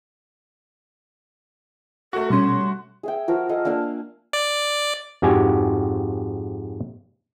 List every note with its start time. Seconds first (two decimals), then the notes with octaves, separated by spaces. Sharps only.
2.13 A3 F#4 A#4
2.30 B2 G3 C#4 C6
3.03 G#4 E5 G5
3.28 F3 F#4 A#4
3.49 A4 D#5 F5 G#5
3.65 A#3 D4 F5 E6
4.33 D5
5.22 F2 G#2 F#4 G4 G#5